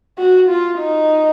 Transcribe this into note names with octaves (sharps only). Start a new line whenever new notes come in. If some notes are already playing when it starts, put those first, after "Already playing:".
F#4
F4
D#4